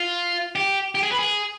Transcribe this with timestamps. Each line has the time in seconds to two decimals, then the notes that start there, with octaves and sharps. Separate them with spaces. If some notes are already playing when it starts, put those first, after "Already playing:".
Already playing: F4
0.55 G4
0.95 G4
1.03 G#4
1.12 B4
1.19 G#4